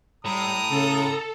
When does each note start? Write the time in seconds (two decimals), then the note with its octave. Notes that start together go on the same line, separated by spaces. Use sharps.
0.25 A2 G3 A#5 D#6
0.69 C#3 A4